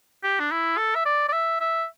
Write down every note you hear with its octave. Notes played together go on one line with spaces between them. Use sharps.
G4
D4
E4
A4
E5
D5
D5
E5
E5